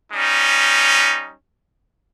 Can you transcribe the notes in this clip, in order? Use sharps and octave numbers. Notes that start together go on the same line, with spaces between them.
G3 C#4 D#4